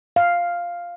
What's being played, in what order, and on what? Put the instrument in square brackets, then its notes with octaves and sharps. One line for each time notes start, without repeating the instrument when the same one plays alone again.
[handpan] F5